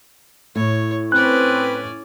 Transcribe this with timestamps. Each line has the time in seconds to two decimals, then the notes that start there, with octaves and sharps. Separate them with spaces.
0.56 A2 C#5
1.12 C4 C#4 B4 D5 F#6